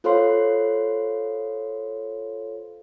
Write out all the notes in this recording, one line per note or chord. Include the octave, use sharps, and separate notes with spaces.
F4 A4 C5 C#5 F5 C6